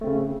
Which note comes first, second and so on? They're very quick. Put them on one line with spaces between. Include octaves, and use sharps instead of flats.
A3 C4 C#3